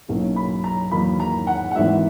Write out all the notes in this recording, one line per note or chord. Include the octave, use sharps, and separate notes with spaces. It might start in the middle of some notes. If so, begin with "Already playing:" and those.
B1 B2 A#3 C#4 E4
B5
A#5
E2 D#3 F#3 A#3 D#4 B5
A#5
F#5
F#5
G#1 G#2 E3 E5